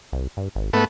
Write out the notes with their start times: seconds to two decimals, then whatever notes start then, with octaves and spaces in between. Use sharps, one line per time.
0.13 C2
0.37 G2
0.55 G#1
0.73 G#2 A3 B3